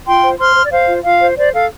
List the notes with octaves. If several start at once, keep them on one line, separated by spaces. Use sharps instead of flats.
F4 G5 C6
C5
C5 C6 F6
C5
D5
C5 F5
F4
F4 F5
C5
C5 D5
A4 F5